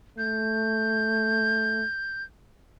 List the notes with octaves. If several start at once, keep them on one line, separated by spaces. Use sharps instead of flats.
A3 G6